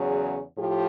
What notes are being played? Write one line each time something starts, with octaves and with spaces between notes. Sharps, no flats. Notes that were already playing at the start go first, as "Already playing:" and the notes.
Already playing: E2 C#3 F#3 G#4
A2 F3 G4